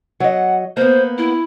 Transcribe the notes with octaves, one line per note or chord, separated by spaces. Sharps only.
F#3 D#5 F#5
A#3 B3 C5
E4